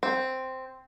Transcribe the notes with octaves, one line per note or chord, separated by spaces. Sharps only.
C4